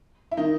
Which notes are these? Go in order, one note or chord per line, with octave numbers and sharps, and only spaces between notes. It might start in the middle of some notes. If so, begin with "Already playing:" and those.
E4
D#3 D#4